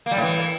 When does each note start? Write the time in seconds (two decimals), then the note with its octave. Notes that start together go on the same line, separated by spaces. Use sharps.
0.06 A#3
0.11 G3
0.17 A2
0.22 E3